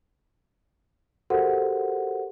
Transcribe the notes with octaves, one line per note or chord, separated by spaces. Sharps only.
F#4 G4 A4 A#4 C5 F#5